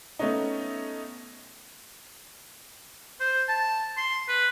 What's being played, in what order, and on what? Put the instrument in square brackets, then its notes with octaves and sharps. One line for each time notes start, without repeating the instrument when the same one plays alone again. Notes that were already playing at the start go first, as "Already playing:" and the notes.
[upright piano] A3 B3 C#4 D#4
[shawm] C5
A5
C6
B4